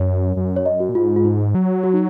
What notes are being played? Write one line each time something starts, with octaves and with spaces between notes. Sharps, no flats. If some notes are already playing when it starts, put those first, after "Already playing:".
Already playing: F#2 C#5
F#2
C#5
D#5
F#4
A#2
G#2 F4
F4
D#4
F#3
F#4
D#4